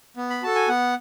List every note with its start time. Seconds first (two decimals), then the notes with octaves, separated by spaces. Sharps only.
0.17 B3
0.30 B5
0.42 F#4 A4 A5
0.55 G#5
0.68 B3 F#5